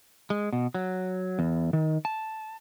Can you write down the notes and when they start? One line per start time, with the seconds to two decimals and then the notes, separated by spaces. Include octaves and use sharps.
0.30 G#3
0.53 B2
0.74 F#3
1.39 E2
1.73 D#3
2.05 A5